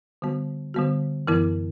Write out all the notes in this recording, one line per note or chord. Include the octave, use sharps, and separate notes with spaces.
D3 G3 B3 F#4
D3 G3 B3 F#4
F#2 E3 B3 E4 A#4